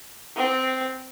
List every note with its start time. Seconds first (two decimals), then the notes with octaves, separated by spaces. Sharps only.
0.36 C4